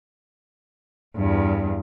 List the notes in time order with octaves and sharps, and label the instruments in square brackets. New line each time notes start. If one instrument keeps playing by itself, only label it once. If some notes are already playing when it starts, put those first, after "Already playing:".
[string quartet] E2 G2